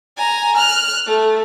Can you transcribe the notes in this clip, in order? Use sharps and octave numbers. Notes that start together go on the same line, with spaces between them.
G#5 A#5
F6 F#6
A3